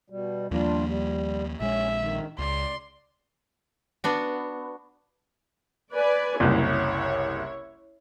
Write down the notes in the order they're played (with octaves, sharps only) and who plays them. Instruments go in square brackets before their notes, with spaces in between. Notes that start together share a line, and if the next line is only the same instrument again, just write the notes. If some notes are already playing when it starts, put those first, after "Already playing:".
[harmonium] B2 G3
[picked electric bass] D#2 F3 A#3 [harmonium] G3 D4 F4
[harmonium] G3
[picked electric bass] A#1 G#3 [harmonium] C#4 [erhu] E5
[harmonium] D#3
[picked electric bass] C#2 [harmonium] D5 [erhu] C6
[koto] B3 D4 F#4
[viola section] B4 D5 G#5
[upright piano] F#1 C2 [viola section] E4 C#5